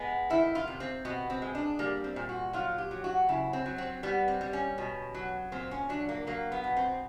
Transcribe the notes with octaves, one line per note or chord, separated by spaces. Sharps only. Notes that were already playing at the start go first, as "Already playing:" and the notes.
Already playing: G#3 B3
D#3 E4
F4
C3
C4
B2 B3
C4
G#3
D4
G3 A#3
C4
A#2
F#4
F#3 F4
G4
F#3
F#4
C#3 E4
C4
F#3
C4
G3 B3
C4
G3
C#4
B2
F#3
A#2 C4
C#4
F#3 D4
A#3
F#3 A#3
B3
B2
C4